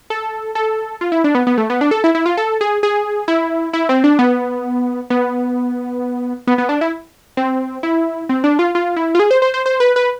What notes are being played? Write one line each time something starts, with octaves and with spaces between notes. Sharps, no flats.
A4
A4
F4
E4
D4
B3
B3
A3
B3
D4
A4
E4
E4
F4
A4
G#4
G#4
E4
E4
C4
D4
B3
B3
B3
B3
D4
E4
C4
E4
C4
D4
F4
F4
E4
F4
G#4
C5
C5
C5
C5
B4
B4